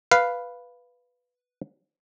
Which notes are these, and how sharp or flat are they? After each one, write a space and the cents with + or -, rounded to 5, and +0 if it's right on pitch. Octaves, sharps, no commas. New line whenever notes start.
B4 +0 F5 +0